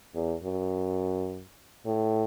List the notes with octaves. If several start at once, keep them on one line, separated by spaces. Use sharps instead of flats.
E2
F#2
A2